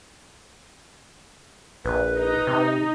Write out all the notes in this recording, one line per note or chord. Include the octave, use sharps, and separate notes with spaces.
A#1 B4
D#4
C3